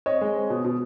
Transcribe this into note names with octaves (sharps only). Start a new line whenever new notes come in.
C4 C#5 D#5
G#3
C4
B2
B2